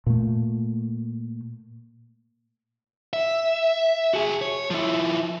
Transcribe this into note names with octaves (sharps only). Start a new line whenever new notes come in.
A#2 A3
E5
F#4 G#4
C#5
F3 E4